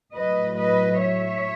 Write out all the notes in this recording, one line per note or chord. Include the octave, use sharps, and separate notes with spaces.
A2 F#3 B4 D#5
B4 D#5
C#5 E5